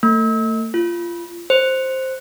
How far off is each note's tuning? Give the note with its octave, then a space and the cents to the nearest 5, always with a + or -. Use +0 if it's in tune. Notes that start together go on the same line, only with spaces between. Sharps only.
A3 +35
F4 -20
C5 +5